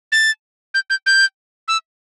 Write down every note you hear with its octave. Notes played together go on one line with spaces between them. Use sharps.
A6
G6
G6
G6
E6